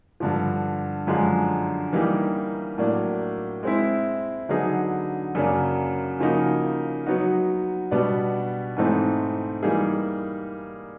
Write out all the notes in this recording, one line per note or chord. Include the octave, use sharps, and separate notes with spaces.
G2 D3 F3
F#2 D3 F3 G#3
E3 G3 A#3 D#4 G4
A2 F#3 A#3 D4
G#3 C4 E4
D3 F#3 B3 D#4 G#4
F#2 C#3 F#3 A#3 D4
C#3 F3 A#3 D#4 F#4
F#3 B3 D#4 F#4
B2 G3 B3 D4 F#4
G#2 E3 A3 C4 D#4
E3 G3 A#3 D#4 G#4